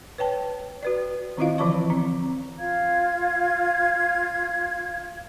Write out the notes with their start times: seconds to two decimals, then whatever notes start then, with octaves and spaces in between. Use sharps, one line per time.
0.18 B4 C#5 G5 A5
0.83 F#4 B4 D5
1.37 D#3 C4 E4 F4 D#5 F5
1.58 D3 E3 F3 A5 C#6
1.90 C4
2.59 F4 F5 G#6